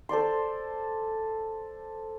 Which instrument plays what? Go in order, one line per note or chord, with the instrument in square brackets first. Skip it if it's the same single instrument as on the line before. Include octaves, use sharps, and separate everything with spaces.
[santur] A4 C5 D5 C6